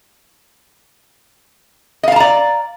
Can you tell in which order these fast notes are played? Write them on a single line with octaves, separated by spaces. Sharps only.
D#5 F5 A5 A#5 D5